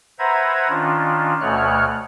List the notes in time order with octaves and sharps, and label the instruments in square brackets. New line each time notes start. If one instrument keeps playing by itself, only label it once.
[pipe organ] B4 C5 E5 F#5 A#5 G#6
D#3 C#4 D4 F4
D2 B2 A3 C#5 F6 F#6